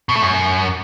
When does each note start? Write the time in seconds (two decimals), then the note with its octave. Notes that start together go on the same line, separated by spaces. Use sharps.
0.09 B2
0.15 A3
0.22 F#2